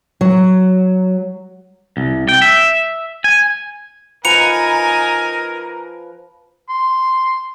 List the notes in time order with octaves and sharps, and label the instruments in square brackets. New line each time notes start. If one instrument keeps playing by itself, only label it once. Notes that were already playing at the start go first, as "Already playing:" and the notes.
[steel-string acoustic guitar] F#3
[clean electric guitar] C2
G5
E5
G#5
[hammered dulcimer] F3 B4 A#5 [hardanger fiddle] D#4 G#5 [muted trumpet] A#4 [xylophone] C#7 F7
[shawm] C6